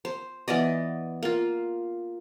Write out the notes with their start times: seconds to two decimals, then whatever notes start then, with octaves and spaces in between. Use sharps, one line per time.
0.05 C5
0.48 E3 B3 D5 D#5
1.23 A#3 F4